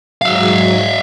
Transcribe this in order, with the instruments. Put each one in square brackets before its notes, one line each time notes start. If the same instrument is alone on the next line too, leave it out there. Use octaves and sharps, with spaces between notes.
[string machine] G#2 F#3 [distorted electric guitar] E5 F5